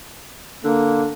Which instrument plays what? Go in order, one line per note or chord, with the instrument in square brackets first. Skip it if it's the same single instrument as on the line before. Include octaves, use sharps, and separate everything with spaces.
[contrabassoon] D3 [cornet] A#3